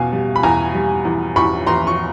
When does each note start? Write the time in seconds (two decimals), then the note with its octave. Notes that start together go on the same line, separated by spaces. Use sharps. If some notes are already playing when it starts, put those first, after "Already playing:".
Already playing: E2 B2 F5 G#5
0.13 G3
0.36 B5
0.43 E2 G#5 A#5
0.74 G3
1.05 E2
1.36 E2 B5 C#6
1.66 E2 A#5 C6
1.87 C#6